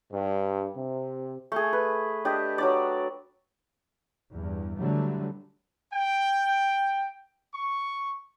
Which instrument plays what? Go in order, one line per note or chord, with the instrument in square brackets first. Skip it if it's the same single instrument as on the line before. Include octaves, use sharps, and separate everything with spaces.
[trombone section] G2
C3
[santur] A3 G#4
B4
D4 G4 D#5
F#3 D4 D5
[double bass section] E2 G2
D3 E3 F#3 G3 A3
[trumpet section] G5
C#6